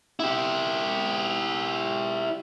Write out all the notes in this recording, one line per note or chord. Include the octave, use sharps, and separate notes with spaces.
E4 G4